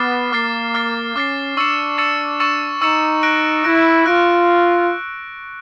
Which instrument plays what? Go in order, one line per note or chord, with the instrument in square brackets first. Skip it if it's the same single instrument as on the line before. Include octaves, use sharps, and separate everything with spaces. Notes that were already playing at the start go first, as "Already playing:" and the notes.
Already playing: [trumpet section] B3 [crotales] D6 F6 A6 C7
[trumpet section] A#3 [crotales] D6 F6 A6 C7
[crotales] D6 F6 A6 C7
[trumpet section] C#4 [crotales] D6 F6 A6 C7
[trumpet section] D4 [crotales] C#6 E6 A6 C#7 E7
[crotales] C#6 E6 A6 C#7 E7
C#6 E6 A6 C#7 E7
[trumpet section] D#4 [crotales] C#6 E6 A6 C#7 E7
[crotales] F#6 A#6 D7
[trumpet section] E4 [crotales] F#6 A#6 D7
[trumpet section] F4 [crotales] F#6 A#6 D7